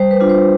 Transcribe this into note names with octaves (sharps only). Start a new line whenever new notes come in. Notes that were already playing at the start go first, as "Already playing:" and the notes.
Already playing: G3 C5
B4
D4 F4
C5